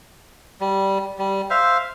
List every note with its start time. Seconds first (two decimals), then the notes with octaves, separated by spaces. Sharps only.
0.61 G3
1.18 G3
1.50 C5 E5 F5